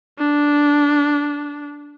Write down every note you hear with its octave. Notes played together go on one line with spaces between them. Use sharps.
D4